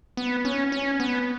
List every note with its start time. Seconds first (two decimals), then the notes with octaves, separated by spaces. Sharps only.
0.17 B3
0.45 C#4
0.72 C#4
1.00 B3